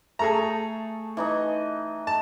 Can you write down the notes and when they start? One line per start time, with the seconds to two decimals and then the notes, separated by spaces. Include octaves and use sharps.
0.19 A3 G#4 A4 A#5
1.17 E3 D#4 D#5
2.07 A5